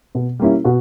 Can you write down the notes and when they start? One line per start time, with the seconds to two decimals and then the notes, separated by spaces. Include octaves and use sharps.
0.15 B2
0.39 G3 A#3 C#4 E4
0.64 B2 F#4